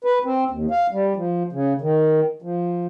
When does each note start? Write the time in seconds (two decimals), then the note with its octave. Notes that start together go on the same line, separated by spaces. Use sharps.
0.04 B4
0.25 C4
0.51 D#2
0.71 F5
0.93 G3
1.16 F3
1.53 C#3
1.82 D#3
2.42 F3